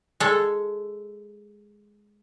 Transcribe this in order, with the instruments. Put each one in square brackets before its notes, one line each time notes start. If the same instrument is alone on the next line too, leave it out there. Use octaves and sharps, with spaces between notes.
[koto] G#3 A4